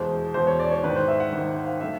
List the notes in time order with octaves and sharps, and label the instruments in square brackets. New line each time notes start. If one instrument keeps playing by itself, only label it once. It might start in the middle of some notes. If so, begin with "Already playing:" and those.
Already playing: [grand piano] E2 B2 G#3 C5
E2 B2 G#3 C5
C#5
D5
C#5
G#1 G#2 D#3 B4
C5
E5
F#5
G#1 G#2 D#3
F5
D3 F#3 A3 E5